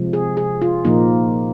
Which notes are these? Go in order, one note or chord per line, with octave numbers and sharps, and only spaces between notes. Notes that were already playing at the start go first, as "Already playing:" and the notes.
Already playing: C3 F3 G#3
G#4
G#4
F4
A#2 F3 A#3 D#4